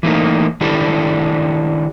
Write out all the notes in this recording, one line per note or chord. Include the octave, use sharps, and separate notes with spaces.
E3 A3 A#3 D#4
D#3 D4 E4 G4 A4